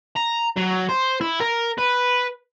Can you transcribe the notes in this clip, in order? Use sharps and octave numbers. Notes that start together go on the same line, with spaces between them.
A#5
F#3
C5
E4
A#4
B4